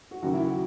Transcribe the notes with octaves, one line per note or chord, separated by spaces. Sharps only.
F#4
D#2 C#3 F#3 F#4
E4
F#4